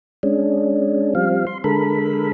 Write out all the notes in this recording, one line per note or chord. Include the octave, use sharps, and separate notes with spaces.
G#3 C#4 D4
F3 G3 C4 F5
C6
D3 G#3 A4 A#4 B5